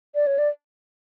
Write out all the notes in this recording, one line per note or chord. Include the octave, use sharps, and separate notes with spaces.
D5
C#5
D5